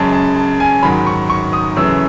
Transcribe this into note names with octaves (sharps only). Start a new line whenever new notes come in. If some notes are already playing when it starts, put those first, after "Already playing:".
Already playing: F#2 C#3 G#3 C#4 A5
A5
A5
G#5
G#2 D#3 F#3 B5
C#6
C#6
D#6
F#2 C#3 E3 A3 E6